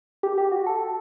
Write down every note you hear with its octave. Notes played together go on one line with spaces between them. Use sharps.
G4
G4
F#4
A4